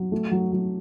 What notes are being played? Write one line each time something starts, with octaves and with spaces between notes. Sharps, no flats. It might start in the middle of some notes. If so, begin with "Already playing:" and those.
Already playing: F#3
A3
F#3
F#3